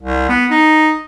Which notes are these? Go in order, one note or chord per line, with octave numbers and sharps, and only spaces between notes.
C2
B3
D#4